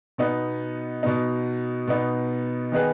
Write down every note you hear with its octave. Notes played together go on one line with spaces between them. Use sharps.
B2 B3 D#4
B2 B3 D#4
B2 B3 D#4
D#3 B3 D#4 G#4 B4